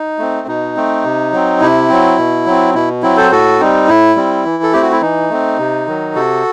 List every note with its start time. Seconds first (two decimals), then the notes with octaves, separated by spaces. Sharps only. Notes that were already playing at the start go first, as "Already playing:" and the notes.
Already playing: D#4
0.19 A3 C4
0.47 B2 D#4
0.76 A3 C4
1.04 C3
1.32 F#3 C4
1.61 C3 E4
1.89 F#3 C4
2.18 B2
2.46 F#3 C4
2.74 B2 E4
3.03 F#3 C4 E4
3.17 A4 C5
3.31 A2 F#4 A4
3.60 G3 C4 D#4
3.88 A2 E4
4.16 G3 C4
4.45 E3
4.63 A4
4.72 A3 C4 G4
4.83 F#4
4.92 E4
5.01 E3 D#4
5.30 A3 C4
5.59 C3
5.87 D#3 F#3
6.15 C3 F#4 A4